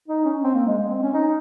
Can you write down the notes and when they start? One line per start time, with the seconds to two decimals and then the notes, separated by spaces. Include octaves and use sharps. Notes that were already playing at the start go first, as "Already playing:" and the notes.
0.08 D#4
0.25 C#4
0.43 C4
0.55 A#3
0.67 G#3
0.78 G#3
0.90 C4
1.02 C#4
1.14 D#4